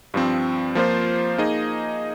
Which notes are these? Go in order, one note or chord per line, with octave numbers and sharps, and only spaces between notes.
G2 F3 C4
F3 A#3 F4 C5
A#3 D#4 G#4 D#5